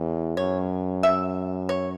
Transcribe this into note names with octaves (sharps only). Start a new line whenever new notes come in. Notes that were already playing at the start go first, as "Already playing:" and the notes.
Already playing: E2
F#2 C#5
E5
C#5